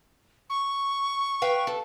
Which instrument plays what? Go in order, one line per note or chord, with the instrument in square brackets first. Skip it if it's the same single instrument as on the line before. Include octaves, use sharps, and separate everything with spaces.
[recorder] C#6
[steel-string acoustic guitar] B4 F5 G5
A4